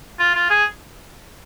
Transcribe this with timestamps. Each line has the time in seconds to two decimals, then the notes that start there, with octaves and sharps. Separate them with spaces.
0.20 F4
0.35 F4
0.50 G#4